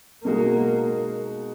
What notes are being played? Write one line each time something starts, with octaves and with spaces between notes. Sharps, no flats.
B2 G#3 A#3 D#4 F#4